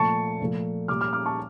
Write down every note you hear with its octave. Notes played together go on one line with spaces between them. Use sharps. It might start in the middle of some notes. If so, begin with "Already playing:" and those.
Already playing: A#2 F3 A3 A5 C#6
A#2 F3 A3
A#2 G3 D6 F6
D6 F6
D6 F6
A5 C#6